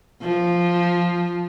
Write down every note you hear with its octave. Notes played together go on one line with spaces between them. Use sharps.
F3